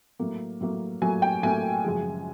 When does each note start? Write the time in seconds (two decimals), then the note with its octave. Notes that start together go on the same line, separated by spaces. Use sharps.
0.19 A2 F#3 A#3
0.61 A2 F#3 A#3
1.01 A2 F#3 A#3 G#5
1.22 G5
1.43 A2 F#3 A#3 G#5
1.84 F#2 C#3 F3 G#3